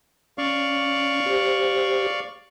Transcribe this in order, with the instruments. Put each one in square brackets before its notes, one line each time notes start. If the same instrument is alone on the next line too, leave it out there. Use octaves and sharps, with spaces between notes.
[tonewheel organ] C#4 [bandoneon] D5 F5 C#6
[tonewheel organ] G4 C5